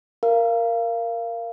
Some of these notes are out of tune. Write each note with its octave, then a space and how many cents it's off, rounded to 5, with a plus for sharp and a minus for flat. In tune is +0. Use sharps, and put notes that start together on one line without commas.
A#4 +0 F5 -20